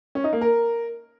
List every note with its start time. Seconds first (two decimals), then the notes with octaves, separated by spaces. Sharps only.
0.15 C#4
0.24 D#4
0.33 A#3
0.41 A#4